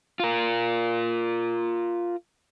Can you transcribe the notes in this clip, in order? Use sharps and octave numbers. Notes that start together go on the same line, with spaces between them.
F4 A#4